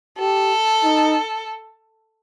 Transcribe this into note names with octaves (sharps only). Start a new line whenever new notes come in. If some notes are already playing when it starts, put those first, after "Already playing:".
G4 A4
D#4